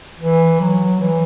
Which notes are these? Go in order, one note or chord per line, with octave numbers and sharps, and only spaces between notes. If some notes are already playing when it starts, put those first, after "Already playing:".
E3
F#3
E3